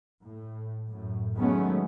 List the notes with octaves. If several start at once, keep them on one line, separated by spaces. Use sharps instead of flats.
A2
F#2 A2
D#3 F#3 G#3 A3 B3 C#4